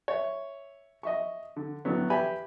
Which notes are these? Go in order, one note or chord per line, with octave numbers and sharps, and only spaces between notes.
C#5 E5
D#5 E5 C#6
D3
A2 D3 F#3 B3
G4 B4 D5 E5 G#5 B5